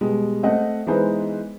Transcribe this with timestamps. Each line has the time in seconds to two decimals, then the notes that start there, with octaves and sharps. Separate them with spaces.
0.01 B2 G3 G#3
0.43 A3 C4 D#5 F#5
0.87 E3 G#3 B3 D#4 B4 C5